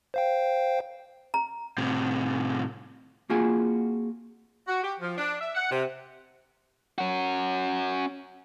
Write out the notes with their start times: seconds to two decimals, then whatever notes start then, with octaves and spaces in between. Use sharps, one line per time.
0.14 C5 F5 G5
1.34 A#5
1.78 A2 C3
3.30 A#3 C4 F4 F#4 G#4 G#5
4.68 F#4
4.83 G4
5.00 F3
5.17 D4
5.41 E5
5.55 F#5
5.71 C3
6.98 C#4 F#4